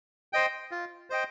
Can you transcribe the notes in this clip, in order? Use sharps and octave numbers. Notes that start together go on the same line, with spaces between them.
C5 D#5 G5
F4
C5 D#5 G5